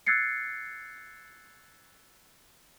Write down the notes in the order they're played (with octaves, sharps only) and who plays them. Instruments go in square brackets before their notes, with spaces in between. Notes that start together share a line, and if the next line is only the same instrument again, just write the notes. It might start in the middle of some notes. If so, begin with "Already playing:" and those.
[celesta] E6 F#6 G#6 A6 C7 C#7